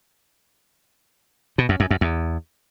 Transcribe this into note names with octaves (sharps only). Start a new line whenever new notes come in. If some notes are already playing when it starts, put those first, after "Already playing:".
B2
F#2
F#2
F#2
E2